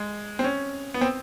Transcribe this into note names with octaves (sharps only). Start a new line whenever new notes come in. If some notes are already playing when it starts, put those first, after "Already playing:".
Already playing: G#3
C4
C#4
B3
C4